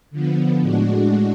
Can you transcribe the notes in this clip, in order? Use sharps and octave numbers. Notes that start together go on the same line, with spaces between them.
D3 F3 B3
A2 G#3 D4 F#4